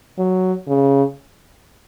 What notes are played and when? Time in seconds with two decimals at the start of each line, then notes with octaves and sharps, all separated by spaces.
0.18 F#3
0.68 C#3